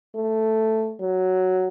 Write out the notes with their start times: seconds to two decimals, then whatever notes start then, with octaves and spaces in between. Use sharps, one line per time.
0.15 A3
1.00 F#3